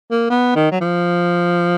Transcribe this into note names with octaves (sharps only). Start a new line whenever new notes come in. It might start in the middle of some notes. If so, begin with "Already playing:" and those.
A#3
B3
D#3
F#3
F3